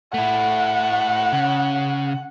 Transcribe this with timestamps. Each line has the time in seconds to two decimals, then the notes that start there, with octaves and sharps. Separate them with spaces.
0.14 A3 E4 F#5
1.33 C#3